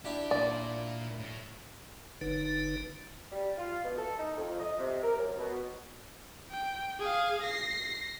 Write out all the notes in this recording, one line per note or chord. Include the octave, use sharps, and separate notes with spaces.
D4 E4 G4
A#2 D5
A2
F#1 D3 D#4 B4
G3
F4
B2
A4
D#4
F2
D#5
C3
A#4
F#2
B2
G5
G#4 F5
A#6 C7